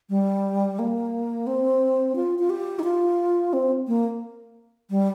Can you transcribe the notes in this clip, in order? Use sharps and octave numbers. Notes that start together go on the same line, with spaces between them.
G3
A#3
C4
F4
F4
G4
D#4
F4
C4
A#3
G3